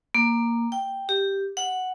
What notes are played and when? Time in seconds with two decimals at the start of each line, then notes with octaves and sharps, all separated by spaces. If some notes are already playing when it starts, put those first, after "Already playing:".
0.15 A#3
0.72 G5
1.09 G4
1.57 F#5